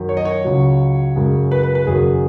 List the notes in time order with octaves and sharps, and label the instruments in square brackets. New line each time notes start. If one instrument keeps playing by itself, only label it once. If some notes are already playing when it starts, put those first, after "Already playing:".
Already playing: [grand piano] F#2 D#3 F#3
C#5
D#5
C#5
C#2 C#3 F#3
F#2 C#3 G#3
B4
B4
B4
F#1 F#2 D#3 F#3 G#4